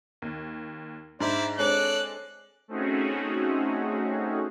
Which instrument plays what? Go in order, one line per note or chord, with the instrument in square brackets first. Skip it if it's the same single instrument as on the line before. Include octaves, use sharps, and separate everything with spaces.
[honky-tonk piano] D#2
[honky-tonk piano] G#2 D4 [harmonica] E4 C5 D5
[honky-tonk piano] G#3 C4 D4 [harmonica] A4 D5 [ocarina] C#5 [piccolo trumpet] F#6
[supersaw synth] A3 C4 C#4 D#4 F#4 G#4